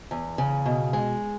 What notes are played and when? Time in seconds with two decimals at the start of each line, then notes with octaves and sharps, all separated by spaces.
0.11 E2
0.38 C#3
0.66 B2
0.93 G#3